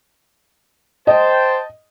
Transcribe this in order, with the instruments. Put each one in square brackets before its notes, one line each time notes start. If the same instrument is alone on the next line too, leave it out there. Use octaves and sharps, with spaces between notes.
[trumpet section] C5 [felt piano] D#5 [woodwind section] G5 A5